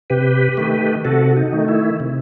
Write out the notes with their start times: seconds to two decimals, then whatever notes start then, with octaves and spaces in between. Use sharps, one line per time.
0.10 C3 G4 B4
0.57 D#3 A3
1.05 C3 F#4 A4
1.36 D#4
1.52 D#3 A3
1.68 E4
2.00 C3